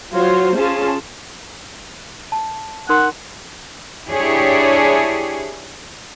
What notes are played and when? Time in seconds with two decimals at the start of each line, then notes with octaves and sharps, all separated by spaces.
0.12 F#3 F4 F#4 C5 C#5
0.56 C#4 F4 G#4 A5
2.32 A5
2.89 D#4 A#4 F#5 C6
4.07 D4 E4 G4 G#4 C#5